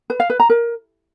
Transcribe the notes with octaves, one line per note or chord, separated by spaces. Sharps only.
B4
F5
B4
A#5
A#4